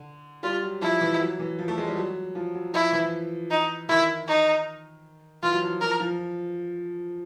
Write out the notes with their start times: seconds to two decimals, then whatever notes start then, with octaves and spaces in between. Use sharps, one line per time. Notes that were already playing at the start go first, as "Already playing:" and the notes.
Already playing: D3
0.43 G3 F4
0.62 F#3
0.82 F3 E4
1.01 E3
1.20 F#3
1.39 E3
1.59 F3
1.68 A3
1.78 G#3
1.87 G3
1.97 F#3
2.35 F3
2.54 F#3
2.73 F3 E4
2.92 E3
3.50 D#4
3.89 D#3 E4
4.28 D#4
5.43 E3 F4
5.53 F#3
5.62 F3
5.81 F3 A#4
6.00 F3